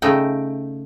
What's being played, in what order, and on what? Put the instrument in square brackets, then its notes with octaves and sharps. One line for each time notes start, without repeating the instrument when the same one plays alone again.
[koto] C#3 A3 D#4 F5 G5